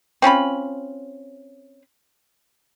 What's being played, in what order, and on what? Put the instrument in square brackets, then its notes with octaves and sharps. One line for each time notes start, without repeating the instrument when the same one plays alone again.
[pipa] C4 C#4 F4 B5